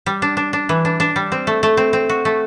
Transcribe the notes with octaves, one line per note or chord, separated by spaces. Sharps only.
G3
D4
D4
D4
E3
D4
D4
G3
C4
A3
A3
C4
C4
F#4
A3